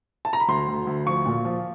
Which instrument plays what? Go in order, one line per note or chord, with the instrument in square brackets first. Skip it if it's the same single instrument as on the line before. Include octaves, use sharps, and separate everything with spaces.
[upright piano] A5
A#5
B5
[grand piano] D2 [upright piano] C6
[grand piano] D2
D2
[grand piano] F3 [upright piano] C#6
[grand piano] A#2
F3